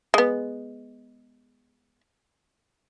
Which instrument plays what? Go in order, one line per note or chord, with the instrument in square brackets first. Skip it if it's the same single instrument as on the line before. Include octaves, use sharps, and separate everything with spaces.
[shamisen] G#3 B3